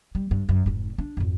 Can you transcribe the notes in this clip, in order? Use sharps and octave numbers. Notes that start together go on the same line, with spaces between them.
G3
G2
F#2
F1 G#2
D4
G#1 F2